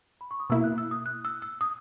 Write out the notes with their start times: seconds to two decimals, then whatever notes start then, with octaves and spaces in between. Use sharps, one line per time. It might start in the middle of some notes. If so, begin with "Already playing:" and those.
0.21 B5
0.31 C#6
0.40 D#6
0.50 B2 A#3 E4 E6
0.64 F#6
0.78 E6
0.91 D#6
1.06 F#6
1.25 E6
1.42 E6
1.61 D#6